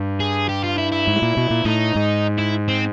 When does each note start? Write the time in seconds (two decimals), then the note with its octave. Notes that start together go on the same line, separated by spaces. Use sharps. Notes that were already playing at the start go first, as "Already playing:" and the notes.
Already playing: G2
0.20 G#4
0.49 G4
0.64 F4
0.78 E4
0.92 E4
1.07 G#2
1.22 A#2
1.37 B2
1.50 A#2
1.65 A2 D#4
1.96 G#2
2.38 E4
2.68 C4